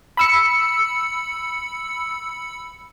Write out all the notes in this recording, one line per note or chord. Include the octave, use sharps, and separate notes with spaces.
B5 E6 C#7